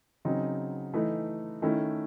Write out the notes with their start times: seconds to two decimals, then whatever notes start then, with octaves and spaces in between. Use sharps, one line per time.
0.25 C#3 F#3 C4 D#4
0.94 E3 A3 D#4
1.62 D#3 A3 C#4 E4